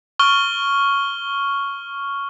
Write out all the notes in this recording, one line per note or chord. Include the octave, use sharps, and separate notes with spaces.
C#6 F6 G7